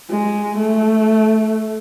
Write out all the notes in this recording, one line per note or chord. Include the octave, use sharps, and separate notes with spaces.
G#3
A3